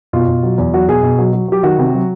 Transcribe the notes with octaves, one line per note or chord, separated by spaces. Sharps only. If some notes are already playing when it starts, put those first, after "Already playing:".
B2 F4
B2
F#3
E2
F#3 F#4
B2 G#4
B2
F#3
F#3
F#3 G4
D#3 F#4
C3
F#3